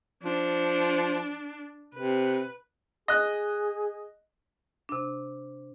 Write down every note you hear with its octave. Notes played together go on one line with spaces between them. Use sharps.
F3 D4
C3 B4
G#4 D#5 F#6
C3 D4